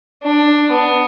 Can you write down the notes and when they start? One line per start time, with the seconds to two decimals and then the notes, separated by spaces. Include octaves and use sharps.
0.23 D4
0.71 B3